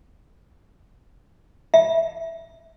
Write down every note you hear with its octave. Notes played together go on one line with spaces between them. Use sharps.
E5